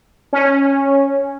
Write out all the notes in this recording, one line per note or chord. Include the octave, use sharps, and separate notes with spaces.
C#4